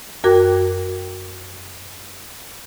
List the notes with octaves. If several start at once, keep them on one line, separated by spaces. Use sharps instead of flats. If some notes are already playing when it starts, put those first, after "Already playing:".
F#2 F#4 A#4 G5 D6 G#6